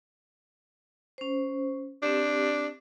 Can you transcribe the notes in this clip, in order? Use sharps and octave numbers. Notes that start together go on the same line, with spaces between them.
C#4 C5
C4 D4 G4